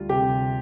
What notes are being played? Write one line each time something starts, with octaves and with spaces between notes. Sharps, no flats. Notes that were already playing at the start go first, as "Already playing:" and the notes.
Already playing: D2 G3 F4
C3 G4